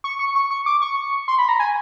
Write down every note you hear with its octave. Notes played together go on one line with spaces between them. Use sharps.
C#6
C#6
C#6
C#6
D6
C#6
C6
B5
A#5
G#5